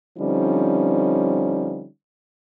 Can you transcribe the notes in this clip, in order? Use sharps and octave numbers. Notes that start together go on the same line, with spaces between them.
D3 F3 G3 C4 C#4 D#4